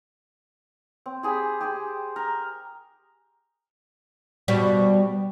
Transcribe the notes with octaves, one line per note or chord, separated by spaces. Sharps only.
C4
G4 G#4 B5
G4 G#4 C5
A#4
B2 G3